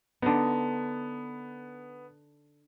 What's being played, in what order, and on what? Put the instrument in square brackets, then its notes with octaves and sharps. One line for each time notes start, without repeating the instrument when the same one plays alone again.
[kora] D3 D#4 [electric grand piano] B3